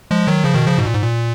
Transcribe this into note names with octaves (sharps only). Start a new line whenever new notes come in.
F3 G#3
D#3 F#3
C#3 F3
B2 D#3
C#3 F3
G#2 B2
A#2
G#2
A#2